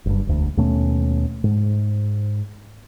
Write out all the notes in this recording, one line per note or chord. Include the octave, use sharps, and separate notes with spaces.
F#1 G2
E1 D2
D#2 B2 A3 C#4
G#2